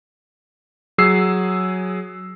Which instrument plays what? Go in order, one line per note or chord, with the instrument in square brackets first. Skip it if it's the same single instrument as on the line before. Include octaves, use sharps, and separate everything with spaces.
[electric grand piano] F#3 G#4 E6 C7